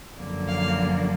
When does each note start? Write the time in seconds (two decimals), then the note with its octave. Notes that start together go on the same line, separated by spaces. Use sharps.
0.18 F#2 D3 F3 A#3
0.48 F5